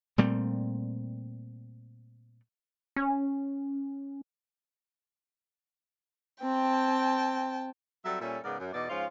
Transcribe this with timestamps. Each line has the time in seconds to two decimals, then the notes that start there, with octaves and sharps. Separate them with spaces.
0.18 A#2 G3 A3 C4
2.96 C#4
6.42 C4 G5 A5
8.05 F#3 G3 C4 A4 E5
8.21 A#2 G3 C#4 A4 E5
8.43 G#2 C#3 B3 A#4 D5
8.59 F#2
8.73 E2 B2 D#4 D5
8.89 G#2 F3 C#4 F4